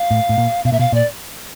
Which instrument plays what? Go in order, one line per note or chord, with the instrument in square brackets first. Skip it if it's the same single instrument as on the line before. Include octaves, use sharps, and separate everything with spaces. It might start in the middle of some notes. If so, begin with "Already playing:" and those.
Already playing: [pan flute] F5
[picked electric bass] A2
A2
A#2
[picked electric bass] B2 [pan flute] F5
[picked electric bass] A#2 [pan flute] E5
[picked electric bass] B2 [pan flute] F5
[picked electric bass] A#2 [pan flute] D5